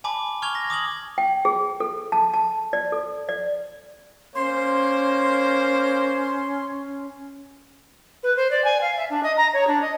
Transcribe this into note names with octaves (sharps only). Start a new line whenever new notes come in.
G#5 A5 B5 D6
C#6 F6 G#6 F7 G7
A#6
D6 D#6 G#6 F#7
G5
G#4
A4
A5
A5
D5
A4
D5
A#3 C#4 C5 C6
B4
C5
D5
G#5
F5
E5
D4
D#5
A#5
C#5
D4
D#5